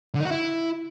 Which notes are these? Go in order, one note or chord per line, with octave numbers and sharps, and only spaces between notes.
D3
D#4
F#4
E4